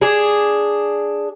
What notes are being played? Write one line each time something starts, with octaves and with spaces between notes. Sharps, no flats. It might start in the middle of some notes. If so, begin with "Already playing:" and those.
D4 G#4